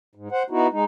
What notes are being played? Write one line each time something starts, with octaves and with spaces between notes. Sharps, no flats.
G#2
C5 F#5
B3 D#4 E4 F#4
G#3 D#4